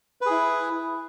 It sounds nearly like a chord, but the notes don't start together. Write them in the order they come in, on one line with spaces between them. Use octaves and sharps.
B4 G#4 E4